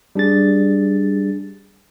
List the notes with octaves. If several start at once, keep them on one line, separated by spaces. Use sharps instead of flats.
G3 D4 G#4 A6